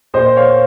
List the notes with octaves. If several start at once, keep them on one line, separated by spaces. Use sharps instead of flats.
A#2 C5 D#5
C#5 F5